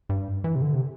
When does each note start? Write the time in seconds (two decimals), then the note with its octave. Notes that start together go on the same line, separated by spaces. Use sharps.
0.09 G2
0.44 E3
0.55 C3
0.62 D3
0.74 C3